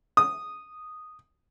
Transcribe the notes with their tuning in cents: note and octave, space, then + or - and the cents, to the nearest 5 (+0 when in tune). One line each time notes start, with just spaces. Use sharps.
D#6 -5